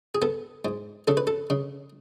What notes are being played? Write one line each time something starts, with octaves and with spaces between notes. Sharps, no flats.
G#4
B3 A4
G#2
C#3 A4
B4
A4
C#3